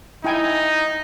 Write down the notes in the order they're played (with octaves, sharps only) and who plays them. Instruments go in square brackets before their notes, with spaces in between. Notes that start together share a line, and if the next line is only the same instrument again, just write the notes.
[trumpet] D#4 [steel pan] E4 G5 G#5